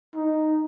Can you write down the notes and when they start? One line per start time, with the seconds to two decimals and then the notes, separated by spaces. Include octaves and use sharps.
0.15 D#4